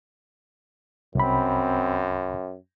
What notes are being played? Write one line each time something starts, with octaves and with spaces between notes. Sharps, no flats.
C2 F#2 C4 B5